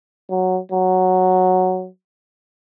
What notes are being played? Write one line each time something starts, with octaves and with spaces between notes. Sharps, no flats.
F#3
F#3